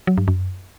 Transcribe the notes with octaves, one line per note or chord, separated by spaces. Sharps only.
F#3
G2
F#2